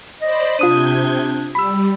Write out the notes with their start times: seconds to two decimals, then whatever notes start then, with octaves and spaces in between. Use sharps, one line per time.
0.22 C5 D5 D#5 B5
0.59 C3 D4 F4 D#6 G6 G#6 D#7
1.55 G3 B5 E6